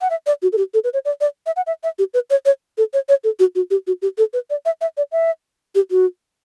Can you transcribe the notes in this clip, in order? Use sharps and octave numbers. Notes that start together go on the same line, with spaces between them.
F#5
E5
D5
F#4
A4
G4
A4
B4
C#5
D5
D5
E5
F#5
E5
E5
G4
B4
C#5
C#5
A4
C#5
C#5
A4
F#4
F#4
G4
F#4
G4
A4
B4
D5
E5
E5
D5
E5
G4
F#4